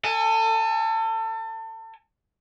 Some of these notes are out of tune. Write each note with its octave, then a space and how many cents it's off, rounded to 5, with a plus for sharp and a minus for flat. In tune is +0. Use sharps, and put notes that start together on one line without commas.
A4 +30 G#5 +0